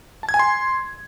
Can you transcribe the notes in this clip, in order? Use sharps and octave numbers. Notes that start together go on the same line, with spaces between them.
A5
G#6
G#5
C6